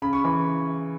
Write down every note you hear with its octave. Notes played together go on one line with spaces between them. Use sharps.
C#3 B5
C#6
E3 B5